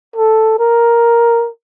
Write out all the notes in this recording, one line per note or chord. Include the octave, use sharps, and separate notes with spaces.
A4
A#4